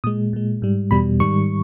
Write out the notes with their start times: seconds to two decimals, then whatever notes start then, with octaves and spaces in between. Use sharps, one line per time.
0.04 A#2 G#3 D#6
0.33 A#2 G#3
0.62 G#2 G3
0.91 E2 B2 G3 B5
1.20 G#2 D#3 G3 C#6